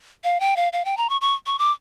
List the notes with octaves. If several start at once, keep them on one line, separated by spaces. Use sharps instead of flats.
F5
G5
F5
F5
G5
A#5
C#6
C#6
C#6
D6